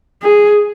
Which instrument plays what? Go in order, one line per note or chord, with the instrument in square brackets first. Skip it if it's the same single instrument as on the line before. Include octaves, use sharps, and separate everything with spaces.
[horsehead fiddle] G#4